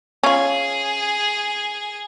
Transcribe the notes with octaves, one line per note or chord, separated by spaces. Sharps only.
C#4 F4 G#4